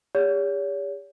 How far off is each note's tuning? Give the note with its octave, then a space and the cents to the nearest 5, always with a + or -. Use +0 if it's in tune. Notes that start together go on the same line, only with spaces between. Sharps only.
G4 +45 C#5 +40